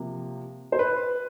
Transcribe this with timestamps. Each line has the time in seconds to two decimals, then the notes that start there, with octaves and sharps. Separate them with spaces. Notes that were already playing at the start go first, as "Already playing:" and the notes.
Already playing: C3 F3 A#3
0.72 C5
0.79 B4